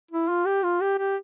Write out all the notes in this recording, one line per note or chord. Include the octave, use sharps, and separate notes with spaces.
E4
F4
G4
F4
G4
G4